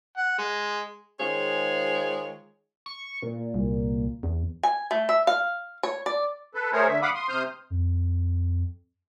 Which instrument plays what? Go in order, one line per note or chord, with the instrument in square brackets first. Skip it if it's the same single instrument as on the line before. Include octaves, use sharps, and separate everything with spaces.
[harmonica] F#5
G#3
[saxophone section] D#3 G#3 F4 G#4 C5 C#5
[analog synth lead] C#6
A#2
[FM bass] C2
E2
[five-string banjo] G#5
A3
E5
F5
C#5
D5
[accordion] A4 B4
A3 G#4 A#4 C5 C#5
D3 E5
F5 F#5 B5 D6 D#6
C6 D#6
C3 C5 D#6 F6 G6
[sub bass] F2